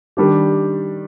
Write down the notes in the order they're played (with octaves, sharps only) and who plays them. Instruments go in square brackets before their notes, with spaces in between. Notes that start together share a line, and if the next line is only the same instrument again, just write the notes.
[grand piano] D#3 G3 D4 G4